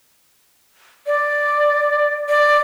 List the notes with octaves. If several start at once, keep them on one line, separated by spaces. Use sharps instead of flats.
D5
D5